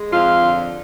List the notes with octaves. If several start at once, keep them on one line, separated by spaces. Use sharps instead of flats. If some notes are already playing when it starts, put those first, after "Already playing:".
Already playing: G#3
F2 F4
D3